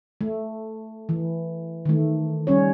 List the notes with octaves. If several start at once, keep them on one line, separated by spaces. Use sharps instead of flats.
A3
E3
D#3 A3
G3 C#4 C#5